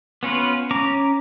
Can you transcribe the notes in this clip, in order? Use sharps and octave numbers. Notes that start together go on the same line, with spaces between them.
B3 C#4 F4 B4
C#4 A#5 D6